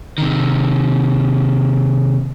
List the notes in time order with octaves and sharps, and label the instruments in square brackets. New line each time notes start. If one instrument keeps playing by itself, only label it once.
[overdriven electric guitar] C3 D#3